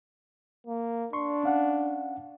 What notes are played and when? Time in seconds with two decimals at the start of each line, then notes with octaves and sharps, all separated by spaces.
0.67 A#3
1.13 D4 C6 C#6
1.44 C#4 F5 F#5